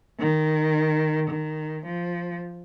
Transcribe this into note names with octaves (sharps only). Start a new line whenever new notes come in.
D#3
D#3
F3